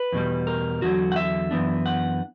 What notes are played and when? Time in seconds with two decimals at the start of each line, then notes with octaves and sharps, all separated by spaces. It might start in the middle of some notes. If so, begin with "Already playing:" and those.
Already playing: B4
0.12 E2 B2 G3
0.47 A#4
0.82 E2 D3 F#3 F#4
1.12 F#5
1.16 E5
1.51 F#2 E3 B3 D4
1.86 F#5